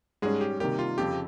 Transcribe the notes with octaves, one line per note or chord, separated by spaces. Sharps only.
G#2 G3 G#3 C#4 G#4
G4
C3 D#3 G3 A#3 G4
F4
F2 C#3 F3 C4 G4